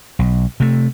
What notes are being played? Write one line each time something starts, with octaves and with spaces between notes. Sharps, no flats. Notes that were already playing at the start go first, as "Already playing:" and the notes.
B1
C3 A3